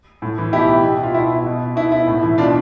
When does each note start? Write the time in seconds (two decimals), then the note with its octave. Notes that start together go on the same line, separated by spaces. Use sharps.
0.22 A2
0.38 E3
0.53 B2 E4 G4
0.84 B2
1.03 F4
1.14 B2 E4
1.46 B2
1.76 B2 E4
1.92 E4
2.07 A2
2.23 E3
2.38 B2 D4 F4